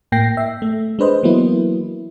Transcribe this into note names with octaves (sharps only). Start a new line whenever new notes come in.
A2 A#3 G5 A#6 C7
E5
A3
G#3 D4 B4 C5 D#5
E3 F#3 A#3 B3 E4